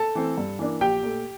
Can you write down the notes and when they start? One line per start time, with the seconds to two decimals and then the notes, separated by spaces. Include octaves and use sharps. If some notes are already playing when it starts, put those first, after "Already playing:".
Already playing: A4 A5
0.15 E3 A3 C4
0.38 G2
0.59 E3 A#3 D4
0.81 A#1 G4 G5
1.03 A#2 A3